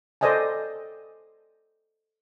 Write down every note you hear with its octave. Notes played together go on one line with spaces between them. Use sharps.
A4 C5 D5 D#5 G#5 A5